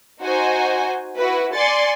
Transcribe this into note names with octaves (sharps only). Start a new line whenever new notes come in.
D#4 F#4 C5 G#5
E4 F#4 B4
D5 G#5 C6 A6 C#7